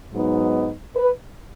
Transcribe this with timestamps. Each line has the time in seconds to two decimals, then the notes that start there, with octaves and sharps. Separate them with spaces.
0.13 G#2 F#3 B3 D#4
0.96 B4